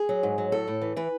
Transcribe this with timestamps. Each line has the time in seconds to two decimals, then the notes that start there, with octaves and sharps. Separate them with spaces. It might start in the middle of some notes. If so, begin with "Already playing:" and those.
Already playing: G#4
0.09 F#3
0.23 G#2
0.38 F#3
0.52 A2 A4
0.68 A2
0.82 E3
0.96 E3 B4